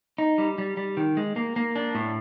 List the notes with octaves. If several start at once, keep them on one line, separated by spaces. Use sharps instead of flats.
D#4
G3
G3
G3
D#3
G#3
A#3
A#3
D4
A2